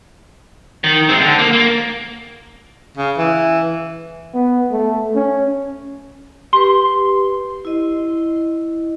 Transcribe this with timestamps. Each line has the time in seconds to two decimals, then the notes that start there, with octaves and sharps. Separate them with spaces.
0.84 D#3
1.09 G#3 C4
1.21 D3
1.39 A#3
1.53 A#3
2.97 C#3
3.18 E3
4.34 B3
4.71 A3
5.15 C#4
6.53 G4 B4 C6
7.65 E4 D#5